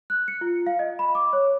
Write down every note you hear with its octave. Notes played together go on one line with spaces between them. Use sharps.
F#6
C#7
F4
F5
D#5
B5
D6
C#5